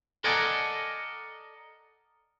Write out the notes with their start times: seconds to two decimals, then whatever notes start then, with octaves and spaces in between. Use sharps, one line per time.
0.24 A4 A#4 D5 D#5 F#5 G#5